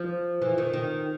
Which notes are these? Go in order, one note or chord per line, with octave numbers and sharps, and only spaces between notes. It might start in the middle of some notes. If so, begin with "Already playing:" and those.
Already playing: F3
E3
D#3
D#3